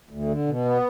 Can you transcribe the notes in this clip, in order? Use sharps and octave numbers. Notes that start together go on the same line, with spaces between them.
D2
D3
B2
B3